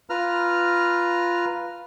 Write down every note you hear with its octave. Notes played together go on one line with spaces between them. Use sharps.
F4 B4 A#5 F6